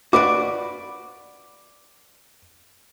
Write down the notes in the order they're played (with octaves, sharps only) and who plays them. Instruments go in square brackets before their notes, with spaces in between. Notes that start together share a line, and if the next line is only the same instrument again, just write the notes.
[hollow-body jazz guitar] F#4 B4 D5 [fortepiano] D6